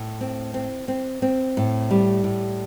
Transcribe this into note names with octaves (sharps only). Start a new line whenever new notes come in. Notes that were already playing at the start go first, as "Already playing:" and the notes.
Already playing: A2
C4
C4
C4
C4
A2
G3
A2